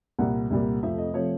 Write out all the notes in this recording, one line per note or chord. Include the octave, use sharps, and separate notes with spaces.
C2 A#2 G3 A#3 F#5
C2 A#2 G3 A#3
F2 C3 F3 A3 E5
D#5
C3 F3 A3 C#5